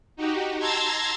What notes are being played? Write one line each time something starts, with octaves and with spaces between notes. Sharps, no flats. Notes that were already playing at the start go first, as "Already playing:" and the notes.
D#4 F#4 G4
A5 A#5 C6 E6 G#6 A6